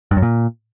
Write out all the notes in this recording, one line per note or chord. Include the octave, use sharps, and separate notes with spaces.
G2
F#2
A#2